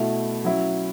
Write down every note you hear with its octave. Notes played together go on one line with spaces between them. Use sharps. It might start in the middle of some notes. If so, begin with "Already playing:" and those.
Already playing: B2 A3 E4
F#3 C#4 E4